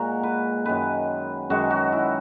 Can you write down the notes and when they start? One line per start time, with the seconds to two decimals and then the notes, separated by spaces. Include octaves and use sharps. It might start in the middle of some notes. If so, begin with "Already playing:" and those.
Already playing: A#2 G#3 F#4 A#4
0.23 B4
0.65 F#2 D#3 G#3 B4
1.50 F#2 D#3 G#3 F#4
1.70 F#4
1.92 E4